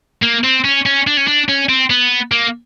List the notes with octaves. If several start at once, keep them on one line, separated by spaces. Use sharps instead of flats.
A#3
C4
C#4
C#4
D4
C#4
D4
C#4
C4
B3
A#3